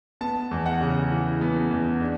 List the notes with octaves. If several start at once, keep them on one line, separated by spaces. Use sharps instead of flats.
B3 A5
E2
F#5
C#3
E3
B3
E2
D4